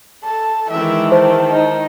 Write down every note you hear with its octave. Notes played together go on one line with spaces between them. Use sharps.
A4 A5
D#3 E3 G#3 E5 G5
C5 A5
D#4